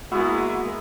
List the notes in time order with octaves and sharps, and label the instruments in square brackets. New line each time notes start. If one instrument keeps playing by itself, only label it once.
[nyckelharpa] G#3 A#3 [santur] B3 E4 [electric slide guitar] F#4